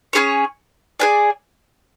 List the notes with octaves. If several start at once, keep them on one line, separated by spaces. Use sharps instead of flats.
C#4 F4 G#4 C#5
G#4 B4 D5 G#5